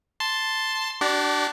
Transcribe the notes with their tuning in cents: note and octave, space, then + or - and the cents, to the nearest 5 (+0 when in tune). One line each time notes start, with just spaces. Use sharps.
A5 +0 C6 +0
D4 +5 F#4 +45 D5 -20